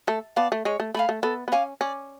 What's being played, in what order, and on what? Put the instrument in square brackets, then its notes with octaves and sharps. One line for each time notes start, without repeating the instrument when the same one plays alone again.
[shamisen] A3 [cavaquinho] A4
[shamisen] B3 [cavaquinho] D5 F5 A5
[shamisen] A3
[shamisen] G#3 [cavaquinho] C#5
[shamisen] A3
[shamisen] A3 [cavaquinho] F5 G#5 B5
[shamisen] A3
[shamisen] B3 [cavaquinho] A4
[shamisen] B3
[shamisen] C#4 [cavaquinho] F5 G#5 D6
[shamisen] C#4 [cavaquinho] D5